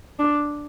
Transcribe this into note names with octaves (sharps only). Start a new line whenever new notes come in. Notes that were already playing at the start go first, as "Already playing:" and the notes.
D4